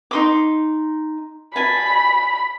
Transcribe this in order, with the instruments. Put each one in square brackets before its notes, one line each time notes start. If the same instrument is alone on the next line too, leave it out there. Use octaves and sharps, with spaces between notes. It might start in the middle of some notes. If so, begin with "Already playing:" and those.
[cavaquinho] D#4 C6 D6
[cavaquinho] G#5 A5 [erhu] B5